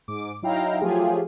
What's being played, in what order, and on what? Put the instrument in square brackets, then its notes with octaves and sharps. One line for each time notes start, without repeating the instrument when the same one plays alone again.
[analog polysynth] G#2 D6
F#3 D#4 E4 F5 G5 A#5
F3 F#3 A3 F4 G4 G#4